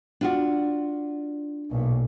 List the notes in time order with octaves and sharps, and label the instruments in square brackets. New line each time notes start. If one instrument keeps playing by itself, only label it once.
[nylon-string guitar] D4 F4 F#4
[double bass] B1 A#2